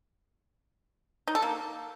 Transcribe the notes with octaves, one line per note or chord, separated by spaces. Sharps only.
D#4
A4
A#3